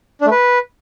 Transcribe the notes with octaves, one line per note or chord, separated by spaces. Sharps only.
D4
A3
B4